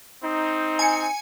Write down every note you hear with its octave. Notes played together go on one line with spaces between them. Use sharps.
C4 D#4
G#5 C#7